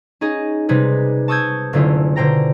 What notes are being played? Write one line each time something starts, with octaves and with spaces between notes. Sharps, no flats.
C#4 D#4 G#4 D#5
C3 G3 G#3 D#4 G#4 B4
A5 C#6 D#6 E6 G6 G#6
F#1 D3 A3 C#4 E4 F4
B2 D3 C5 G5 A#5 A#6